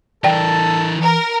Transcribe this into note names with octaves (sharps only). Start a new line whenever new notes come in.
E3 A4 A#4 D5 G5 A5
A#4